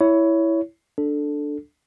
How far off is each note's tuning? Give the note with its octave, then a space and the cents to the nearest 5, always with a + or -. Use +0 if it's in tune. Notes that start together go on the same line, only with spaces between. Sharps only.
E4 +0 C#5 +15
D4 +0 A4 +0